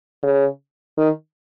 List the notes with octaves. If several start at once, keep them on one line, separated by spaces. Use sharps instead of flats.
C#3
D#3